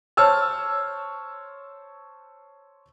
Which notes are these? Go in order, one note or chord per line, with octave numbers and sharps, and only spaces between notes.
C5 C#5 A5 E6 F6